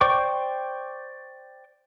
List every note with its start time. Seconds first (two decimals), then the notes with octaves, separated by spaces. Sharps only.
0.01 C5 D5 G5 C#6 D6